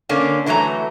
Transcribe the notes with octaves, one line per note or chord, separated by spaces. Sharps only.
D3 A#3 C#4 D4
D3 E3 F#3 A3 A#5